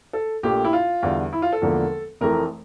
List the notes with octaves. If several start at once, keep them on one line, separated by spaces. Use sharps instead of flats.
A4
A#1 A#2 A3 G4
E4
F4
E2 D3 G3
E4
F4
A4
E1 E2 D3 F3 A#3
F1 F2 E3 A3 A#4